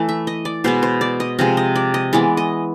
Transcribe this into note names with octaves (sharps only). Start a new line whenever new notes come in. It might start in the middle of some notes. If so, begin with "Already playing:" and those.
Already playing: E3 A3
E5
D#5
D5
B2 G#3 B3 C5
C5
D5
D#5
C3 F3 G#3 D#5
D#5
D5
D#5
E3 G#3 B3 D5
D#5